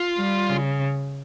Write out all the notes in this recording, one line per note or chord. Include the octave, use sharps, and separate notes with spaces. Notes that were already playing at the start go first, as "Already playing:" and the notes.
Already playing: F4
G3
C#3